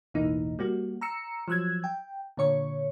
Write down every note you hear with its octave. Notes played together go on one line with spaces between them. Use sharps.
A1 E2 B2 E3 A#3 D#4
G3 A#3 F#4
A#5 E6 C#7
F3 F#3 E6 F#6 G#6
G5
A#2 D3 C#5 C#6